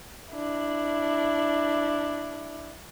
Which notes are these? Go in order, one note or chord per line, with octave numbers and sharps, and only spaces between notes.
D4 E4